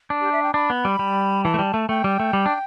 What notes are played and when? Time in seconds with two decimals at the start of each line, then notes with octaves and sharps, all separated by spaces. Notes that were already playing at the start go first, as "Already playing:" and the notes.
0.10 D4
0.21 G4
0.32 E5
0.43 G5
0.54 D4 B5
0.70 B3
0.85 G3
0.99 G3
1.44 E3 A5
1.54 A3
1.59 G3
1.74 A3
1.89 A3 G5
2.04 G3
2.20 A3
2.33 G3
2.46 D4